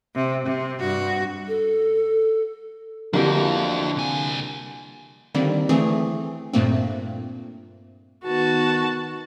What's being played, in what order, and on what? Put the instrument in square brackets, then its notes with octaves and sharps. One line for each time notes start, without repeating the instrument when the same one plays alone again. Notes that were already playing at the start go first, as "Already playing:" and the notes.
[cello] C3
C3
G2 F#4
[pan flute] A4
[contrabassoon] F2 [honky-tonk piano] D3 E3 [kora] A#3 G4 A#4 [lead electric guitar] D4 F#4
[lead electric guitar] C2 G#5
[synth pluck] D3 D#3 G3 A#3 C4
E3 A3 C4 G#4
G2 A#2 A3 A#3 C4
[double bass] D#3 B3 [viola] F#4 A5